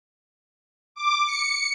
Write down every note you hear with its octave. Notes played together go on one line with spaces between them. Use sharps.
D6
C#7